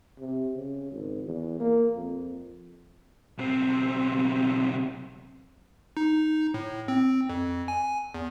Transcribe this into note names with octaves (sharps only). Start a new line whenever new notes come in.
C3
C#3
G#1
E2
A#3
F2
B1 C4
D#4
A2
C4
F2
G#5
E2